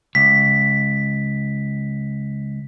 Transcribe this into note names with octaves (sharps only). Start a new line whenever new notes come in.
C#2 B6